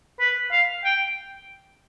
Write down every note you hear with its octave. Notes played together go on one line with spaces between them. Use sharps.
B4
F5
G5